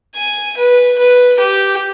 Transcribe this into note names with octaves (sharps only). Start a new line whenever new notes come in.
G#5
B4
B4
G4